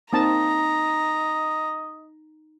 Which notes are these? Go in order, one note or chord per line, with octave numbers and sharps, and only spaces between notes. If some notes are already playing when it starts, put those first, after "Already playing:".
A#3 C4 D#4 D#5 A5 A#5